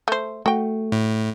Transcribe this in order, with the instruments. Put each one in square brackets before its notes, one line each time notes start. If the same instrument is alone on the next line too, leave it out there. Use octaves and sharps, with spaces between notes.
[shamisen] A3 C5
[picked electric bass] A3 [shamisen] F#4 G5
[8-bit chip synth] A2